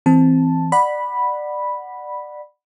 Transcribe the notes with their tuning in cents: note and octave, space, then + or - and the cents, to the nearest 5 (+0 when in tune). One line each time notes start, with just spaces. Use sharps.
E3 -10 C4 +0 A5 +0
D5 +20 F#5 +0 B5 -5